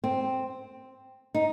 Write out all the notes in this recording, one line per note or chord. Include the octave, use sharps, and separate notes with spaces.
C4
D#4